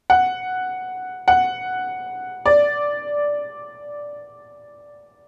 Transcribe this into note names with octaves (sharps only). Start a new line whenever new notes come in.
F#5
F#5
D5